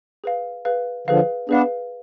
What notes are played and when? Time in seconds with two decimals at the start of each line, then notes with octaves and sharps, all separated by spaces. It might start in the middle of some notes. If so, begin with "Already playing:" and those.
0.24 G#4 B4 F5
0.65 G#4 B4 F5
1.07 D3 F3 G#4 B4 F5
1.49 B3 D4 G#4 B4 F5